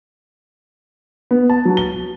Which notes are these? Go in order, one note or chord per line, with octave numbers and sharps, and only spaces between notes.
B3
A5
F#3
G7